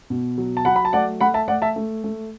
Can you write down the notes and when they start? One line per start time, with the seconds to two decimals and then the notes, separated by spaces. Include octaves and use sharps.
0.10 B2
0.38 F#3
0.57 A5
0.65 F#3 F#5 B5
0.76 B5
0.85 A5
0.93 A3 D5 F#5
1.21 A3 F#5 B5
1.34 E5 A5
1.48 A3 D5 F#5
1.62 E5 A5
1.76 A3
2.04 A3